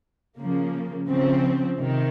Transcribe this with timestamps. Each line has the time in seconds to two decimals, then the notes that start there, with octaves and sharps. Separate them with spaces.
0.38 C#3 F3 A#3
1.08 C#3 F3 C4
1.78 C3 D#3